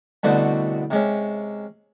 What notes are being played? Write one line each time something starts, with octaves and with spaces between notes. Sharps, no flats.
C2 B2 D3 A3 F#4 C5
C3 G#3 C#4